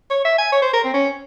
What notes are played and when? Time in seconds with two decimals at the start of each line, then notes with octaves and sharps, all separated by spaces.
0.10 C#5
0.25 E5
0.38 G#5
0.52 C#5
0.62 C5
0.73 A#4
0.84 C4
0.94 C#4